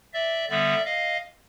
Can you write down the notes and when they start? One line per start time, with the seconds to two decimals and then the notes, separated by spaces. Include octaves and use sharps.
0.13 D5 E5
0.49 D3 G3 B3 D5 E5
0.85 D#5 F5